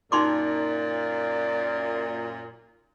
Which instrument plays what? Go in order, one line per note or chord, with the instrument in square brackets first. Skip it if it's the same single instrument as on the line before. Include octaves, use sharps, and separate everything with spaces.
[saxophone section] F#2 A#2 [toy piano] D#4 C6 D6 [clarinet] D5